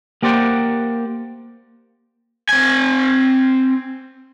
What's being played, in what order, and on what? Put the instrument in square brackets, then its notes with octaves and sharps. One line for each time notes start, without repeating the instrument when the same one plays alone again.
[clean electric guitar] A#3 G4 C5 D5 F#5 G5
[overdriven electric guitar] C4 G#5